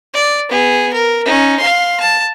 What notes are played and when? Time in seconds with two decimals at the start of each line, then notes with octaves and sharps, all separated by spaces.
0.14 D5
0.49 B3 G#4
0.93 A#4
1.25 C#4 D#4
1.60 F5 C6
2.00 A5